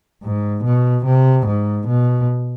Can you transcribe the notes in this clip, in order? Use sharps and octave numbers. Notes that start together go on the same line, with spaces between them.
G#2
B2
C3
G#2
B2